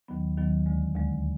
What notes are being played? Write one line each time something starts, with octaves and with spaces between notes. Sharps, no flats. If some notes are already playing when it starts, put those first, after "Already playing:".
D#2 D#3 F#3 B3
D#2 D#3 F#3 B3
D2 D3 G#3
D2 D3 G#3